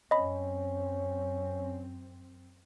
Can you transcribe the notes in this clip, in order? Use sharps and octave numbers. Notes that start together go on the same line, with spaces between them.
F#2 C4 C#4 D#5 B5